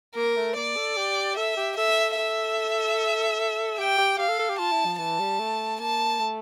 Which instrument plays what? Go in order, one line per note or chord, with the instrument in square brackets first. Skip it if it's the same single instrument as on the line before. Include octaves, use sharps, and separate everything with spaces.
[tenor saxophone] A#3 [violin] A#4
[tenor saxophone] A3
[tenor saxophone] A#3 [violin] D5
[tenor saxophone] A4
G4
[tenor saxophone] A4 [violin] E5
[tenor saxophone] G4
[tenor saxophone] A4 [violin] E5
[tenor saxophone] A4 [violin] E5
[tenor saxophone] G4 [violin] G5
[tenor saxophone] G4
[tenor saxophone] G4 [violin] F5
[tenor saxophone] A4
A4
G4
[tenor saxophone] F4 [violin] A5
[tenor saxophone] E4
F3
[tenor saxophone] E3 [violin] A5
[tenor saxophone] G3
A3
[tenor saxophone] A#3 [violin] A5
[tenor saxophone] A3